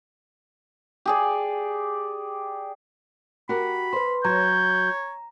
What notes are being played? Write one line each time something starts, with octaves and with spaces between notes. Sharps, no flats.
G4 G#4 D5
F#4 G4 A#4 B5
B4 C5 C6
F#3 C#5 A#5 G6